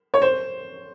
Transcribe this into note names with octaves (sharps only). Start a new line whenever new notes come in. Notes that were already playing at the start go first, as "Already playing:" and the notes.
C#5
C5